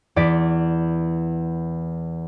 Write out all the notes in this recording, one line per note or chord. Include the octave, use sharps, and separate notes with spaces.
E2 D5 B6